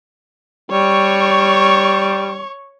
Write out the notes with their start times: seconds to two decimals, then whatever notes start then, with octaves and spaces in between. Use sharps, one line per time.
0.71 G3 C#5 C#6